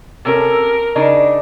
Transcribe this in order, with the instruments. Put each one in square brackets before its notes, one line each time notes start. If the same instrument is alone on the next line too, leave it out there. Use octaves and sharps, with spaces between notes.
[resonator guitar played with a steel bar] C3 C#4 A4 [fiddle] A#4
[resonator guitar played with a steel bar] C#3 D4 D#4